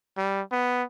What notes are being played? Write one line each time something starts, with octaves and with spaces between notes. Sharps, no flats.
G3
B3